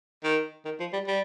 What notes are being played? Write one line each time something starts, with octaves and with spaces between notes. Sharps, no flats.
D#3
D#3
F3
G3
G3